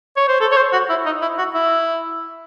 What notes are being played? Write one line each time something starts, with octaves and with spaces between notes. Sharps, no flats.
C#5
C5
A4
C#5
C5
F#4
E4
D#4
E4
F#4
E4